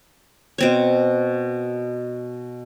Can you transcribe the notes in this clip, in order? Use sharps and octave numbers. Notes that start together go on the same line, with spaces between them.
B2 C4 C#5